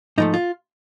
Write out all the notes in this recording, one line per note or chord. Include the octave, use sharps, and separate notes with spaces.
G#2 F3 A3 D#4
F4